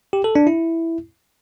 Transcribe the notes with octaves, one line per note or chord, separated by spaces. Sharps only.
G4
A4
D4
E4